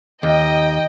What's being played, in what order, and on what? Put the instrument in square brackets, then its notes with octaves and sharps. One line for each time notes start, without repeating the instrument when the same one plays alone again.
[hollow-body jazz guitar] D#2 [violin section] D#5 G5